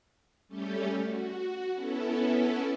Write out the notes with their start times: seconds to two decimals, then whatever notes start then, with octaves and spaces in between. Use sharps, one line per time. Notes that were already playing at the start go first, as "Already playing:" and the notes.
0.48 G3 A3 C#4 G4 A4
1.02 F#4
1.73 B3 C#4 E4 A4